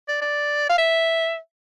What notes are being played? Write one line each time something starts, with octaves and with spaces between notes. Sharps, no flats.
D5
D5
F5
E5